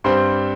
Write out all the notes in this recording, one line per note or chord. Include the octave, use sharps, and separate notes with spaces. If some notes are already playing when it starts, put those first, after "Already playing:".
G2 G3 C4 C5 C6